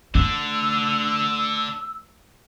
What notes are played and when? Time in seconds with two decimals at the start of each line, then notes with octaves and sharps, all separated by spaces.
0.15 A3 D4 A4 E6